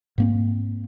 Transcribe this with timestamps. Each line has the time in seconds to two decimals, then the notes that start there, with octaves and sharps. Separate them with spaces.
0.18 G#2 A#3 C4